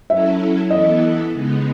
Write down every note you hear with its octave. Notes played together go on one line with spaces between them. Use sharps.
F#3 C#4 E4 A4 E5
E3 B3 E4 A4 D#5
C#3 G#3 B3 D#4